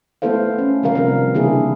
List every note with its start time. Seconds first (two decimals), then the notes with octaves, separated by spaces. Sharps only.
0.22 A3 B3 E4 A4 C5 F5
0.59 C#4
0.83 C3 D#3 G3 A#4 F5
0.95 C3 D#3 F3 G3 B3 C4
1.34 C#3 E3 A#3 D4 E4 G#4